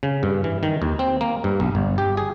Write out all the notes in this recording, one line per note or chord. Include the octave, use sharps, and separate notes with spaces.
C#3
G2
E3
D#3
D#2
C4
A#3
G2
B1
G1
G4
G#4